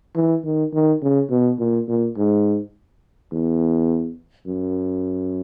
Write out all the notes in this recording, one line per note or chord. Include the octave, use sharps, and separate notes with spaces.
E3
D#3
D#3
C#3
B2
A#2
A#2
G#2
E2
F#2